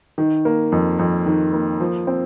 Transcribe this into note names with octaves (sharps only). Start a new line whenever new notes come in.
D#3
A#3
F2
F2
D#3
A#3
F3
C4